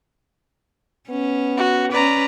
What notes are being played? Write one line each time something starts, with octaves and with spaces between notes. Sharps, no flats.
B3 C#4
F#4
C#4 B4 D5 A#5